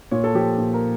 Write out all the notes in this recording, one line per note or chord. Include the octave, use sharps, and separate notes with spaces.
A#2 C#5
A4
F3 G4
A#2
A#4